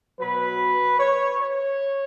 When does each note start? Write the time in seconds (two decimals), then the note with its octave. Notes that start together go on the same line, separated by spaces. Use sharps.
0.19 B2 F#3 B4
0.99 C#5
1.38 C#5